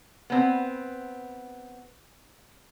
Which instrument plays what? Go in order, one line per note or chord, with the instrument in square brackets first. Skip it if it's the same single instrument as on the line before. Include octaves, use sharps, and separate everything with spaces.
[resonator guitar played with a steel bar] B3 C4